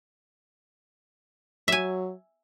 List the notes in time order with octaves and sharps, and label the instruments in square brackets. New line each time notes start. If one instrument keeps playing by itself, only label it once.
[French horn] F#3 [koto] E5 G#5